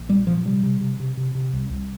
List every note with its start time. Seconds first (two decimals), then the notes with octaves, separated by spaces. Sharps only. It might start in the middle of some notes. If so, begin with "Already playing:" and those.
Already playing: A#1
0.09 A#2 G3
0.27 A#2 F3
0.45 C3 G3
0.63 C3
0.81 C3
1.00 C3
1.17 C3
1.35 C3
1.53 C2
1.71 C2